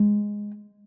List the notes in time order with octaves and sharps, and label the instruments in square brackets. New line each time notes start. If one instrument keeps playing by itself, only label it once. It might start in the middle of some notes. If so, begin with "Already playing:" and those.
Already playing: [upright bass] G#3